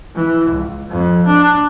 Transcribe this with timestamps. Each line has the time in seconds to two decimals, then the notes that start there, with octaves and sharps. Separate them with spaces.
0.15 E3
0.51 C#2
0.88 F2
1.27 D4